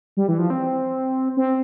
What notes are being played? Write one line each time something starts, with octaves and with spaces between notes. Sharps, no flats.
G3
E3
F3
C4
C4